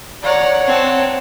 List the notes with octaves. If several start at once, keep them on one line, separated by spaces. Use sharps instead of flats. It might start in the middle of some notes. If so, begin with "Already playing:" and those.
C#5 D5 F#5 A#5
C4 A5